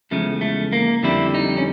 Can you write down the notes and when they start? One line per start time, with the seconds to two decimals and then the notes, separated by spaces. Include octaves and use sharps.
0.11 E2 C#3 F3 G#3 A3
0.41 A3
0.73 A#3
1.03 F2 D3 G3 E4
1.34 D#4
1.57 C#4